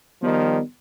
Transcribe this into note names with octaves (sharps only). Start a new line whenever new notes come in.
D#3 F3 G3 B3